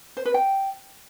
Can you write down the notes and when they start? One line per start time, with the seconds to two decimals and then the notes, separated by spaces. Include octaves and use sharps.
0.17 C5
0.26 B4
0.34 G5